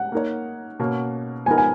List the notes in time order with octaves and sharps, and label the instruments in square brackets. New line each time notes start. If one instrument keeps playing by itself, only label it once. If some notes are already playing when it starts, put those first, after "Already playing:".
Already playing: [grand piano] F#5
[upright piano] A#3 D#4 A#4 C#5
B2 A#3 C#4
[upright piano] F3 B3 D#4 A#4 [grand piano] G#5
[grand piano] G#5